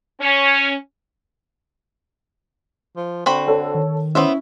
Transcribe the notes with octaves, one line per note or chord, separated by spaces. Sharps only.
C#4
F3
D3 C4 F#4 B5
A4 C#5
D#3
B3 C#4 E4 C5 E5